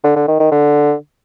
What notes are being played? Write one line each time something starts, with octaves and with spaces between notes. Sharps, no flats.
D3
D3
D#3
D#3
D3